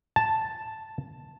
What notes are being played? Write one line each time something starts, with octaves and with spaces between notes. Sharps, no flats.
A5